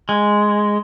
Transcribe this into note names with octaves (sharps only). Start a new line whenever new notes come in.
G#3